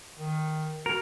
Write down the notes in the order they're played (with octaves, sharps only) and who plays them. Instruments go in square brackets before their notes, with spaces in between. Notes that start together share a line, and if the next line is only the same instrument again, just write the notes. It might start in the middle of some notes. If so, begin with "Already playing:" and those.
[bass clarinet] D#3
[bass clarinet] F#4 [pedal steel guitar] A#4